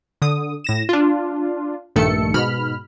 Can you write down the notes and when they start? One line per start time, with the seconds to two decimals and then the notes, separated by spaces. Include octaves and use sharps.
0.22 D3 D#6
0.64 A2 A#6 E7
0.89 D4 F4
1.96 A#1 G2 D#3 A3 A4 C#7
2.34 G#2 B2 B5 F6